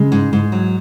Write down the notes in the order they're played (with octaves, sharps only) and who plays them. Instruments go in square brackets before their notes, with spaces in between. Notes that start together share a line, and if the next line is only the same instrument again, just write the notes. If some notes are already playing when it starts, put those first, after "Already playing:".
Already playing: [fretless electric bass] C#3 [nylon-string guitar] G#3
[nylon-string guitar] G#2
G#2
F#3